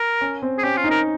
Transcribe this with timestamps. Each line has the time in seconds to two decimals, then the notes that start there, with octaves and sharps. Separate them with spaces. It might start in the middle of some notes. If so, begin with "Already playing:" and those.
Already playing: A#4
0.21 C#4
0.42 C4
0.58 G#4
0.63 C#4 G4
0.77 F4
0.84 D#4
0.91 A#4